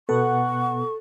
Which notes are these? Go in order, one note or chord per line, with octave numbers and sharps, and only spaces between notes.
B2 B3 A4 F#5 C#6